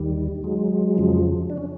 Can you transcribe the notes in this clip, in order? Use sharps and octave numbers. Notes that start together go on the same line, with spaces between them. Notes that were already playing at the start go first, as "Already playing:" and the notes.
Already playing: D#2 D#3 G3
F#3 G#3
F2 C#3 F3
D4
C#4